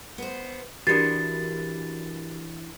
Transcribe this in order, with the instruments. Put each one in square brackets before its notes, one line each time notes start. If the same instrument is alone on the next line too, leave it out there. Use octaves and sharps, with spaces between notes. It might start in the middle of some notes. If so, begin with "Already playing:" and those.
[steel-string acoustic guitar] B3 C5
[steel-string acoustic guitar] E3 D4 [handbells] F#4 G4 A#4 [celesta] A6